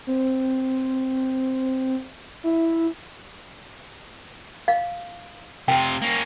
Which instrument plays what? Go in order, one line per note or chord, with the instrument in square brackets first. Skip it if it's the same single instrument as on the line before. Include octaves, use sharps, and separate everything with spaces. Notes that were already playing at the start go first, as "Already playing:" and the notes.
[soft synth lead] C4
E4
[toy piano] F5
[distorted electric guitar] C3 F4 [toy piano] G5
[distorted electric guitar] A#3 C#4